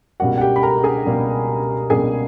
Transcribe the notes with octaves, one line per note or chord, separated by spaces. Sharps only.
C#2 B2 G3 A#3 F#4 F#5
F#5
G4 G5
B5
A#4 A#5
G#4 G#5
C#2 B2 G3 A#3
C#2 B2 G3 A#3 G#4 G#5